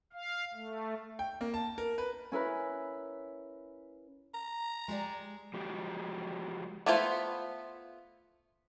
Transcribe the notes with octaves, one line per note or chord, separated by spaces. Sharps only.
F5
A3
G5
A#3
A5
A#4
B4
C#4 E4 A#4 B4
A#5
G#3 G4 D5
F3 G#3 F#4 G4
A3 B3 E4 F4 C5